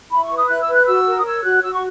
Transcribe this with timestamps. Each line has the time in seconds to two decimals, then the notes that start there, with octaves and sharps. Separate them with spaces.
0.10 E4 B5
0.23 C#6
0.29 B4
0.35 D#6
0.48 E4 F#6
0.61 E6
0.68 B4
0.74 F#6
0.87 F#4 E6
1.06 A#4
1.19 D#6
1.24 C#5 E6
1.44 F#4 F#6
1.63 F#4 E6
1.73 C#6